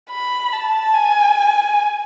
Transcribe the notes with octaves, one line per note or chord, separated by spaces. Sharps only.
B5
A5
G#5